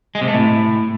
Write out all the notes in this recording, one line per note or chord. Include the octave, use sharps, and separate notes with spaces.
G#3
C3
A3
A2